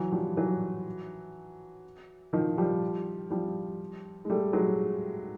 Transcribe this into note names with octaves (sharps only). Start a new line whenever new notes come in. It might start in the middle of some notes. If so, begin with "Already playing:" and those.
Already playing: E3 F#3
F3 G3
E3 F#3
D#3 F3
F3 G3
F3 G3
G#3
G3 A3
F#3 G#3